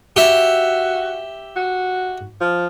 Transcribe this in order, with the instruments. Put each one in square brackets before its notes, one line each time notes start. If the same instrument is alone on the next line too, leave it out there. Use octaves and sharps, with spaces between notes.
[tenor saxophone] F#4 [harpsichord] G4 E5
[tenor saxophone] F#4
F3